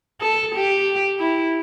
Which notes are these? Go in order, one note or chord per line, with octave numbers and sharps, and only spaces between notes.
A4
G4
E4